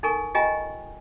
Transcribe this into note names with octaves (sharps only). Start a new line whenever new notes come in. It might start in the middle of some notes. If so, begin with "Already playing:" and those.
D#4 A4 A#4 G#5 C#6
F4 G4 D#5 G5 G#5 A#5